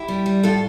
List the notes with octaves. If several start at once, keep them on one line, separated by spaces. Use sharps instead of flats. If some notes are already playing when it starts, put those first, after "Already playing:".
Already playing: E4 G4
G3
G3
A2 F4 A4